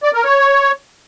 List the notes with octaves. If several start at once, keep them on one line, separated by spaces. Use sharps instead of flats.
D5
A#4
C#5